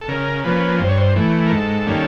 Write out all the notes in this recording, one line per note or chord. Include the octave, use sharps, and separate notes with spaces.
A4
C#3 A#4
F3 A#3 C#4 B4
G2 C5
C#5
C5
E3 A3
A#4
G#2 A4
D#3 G3 A#3 C#4